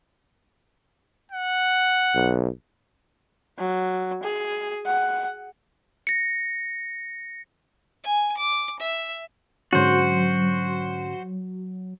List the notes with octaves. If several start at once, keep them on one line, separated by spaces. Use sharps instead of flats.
F#5
B1
F#3
G#4
F#5
A#6 C#7
G#5
D6
E5
G#2 D3 F#3 C#4 F#4 C5